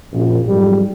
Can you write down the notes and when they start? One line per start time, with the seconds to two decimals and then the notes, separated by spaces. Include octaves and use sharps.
0.12 A#1 F#2
0.47 F2 G#2 F#3 G3